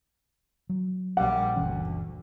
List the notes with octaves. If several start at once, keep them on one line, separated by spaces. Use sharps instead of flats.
F#3
A#1 G3 F#5
F#1 D2 E3 C#4